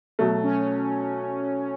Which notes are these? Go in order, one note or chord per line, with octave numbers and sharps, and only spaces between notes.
B2 F#3 A3
C#4